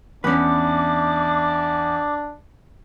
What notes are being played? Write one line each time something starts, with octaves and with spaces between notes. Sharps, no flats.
E2 C#4 D4 B4 D6